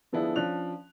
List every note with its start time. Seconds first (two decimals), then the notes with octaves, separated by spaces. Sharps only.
0.12 D3 F3 B3 D4 E4 G#4
0.36 F3 C#4 D4 D5 F#6 F7